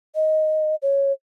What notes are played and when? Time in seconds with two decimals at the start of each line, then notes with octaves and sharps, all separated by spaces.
0.15 D#5
0.82 C#5